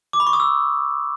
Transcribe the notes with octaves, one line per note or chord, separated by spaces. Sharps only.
D6
B5
C#6
D#6
E6